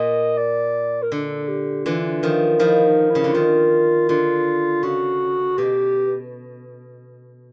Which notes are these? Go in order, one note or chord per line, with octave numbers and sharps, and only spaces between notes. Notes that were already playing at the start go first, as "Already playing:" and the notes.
Already playing: A#2 D#5
D5
A#4
D3 A4
G4
D3 E3 F4
D#3 F3
D#3 F3 E4
D#4
E4
C#3
D3 E4
D#3 F4
D3 F4
C#3 F#4
B2 G4